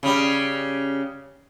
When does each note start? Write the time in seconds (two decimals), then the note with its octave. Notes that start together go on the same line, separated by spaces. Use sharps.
0.03 C#3 G3